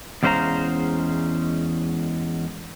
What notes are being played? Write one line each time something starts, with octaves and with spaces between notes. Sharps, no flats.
E2 G#3 C#4 C5 F5 A#5